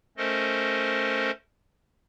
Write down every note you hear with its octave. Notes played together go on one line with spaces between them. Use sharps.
A3 C#4 A4 A#4 C5 D#5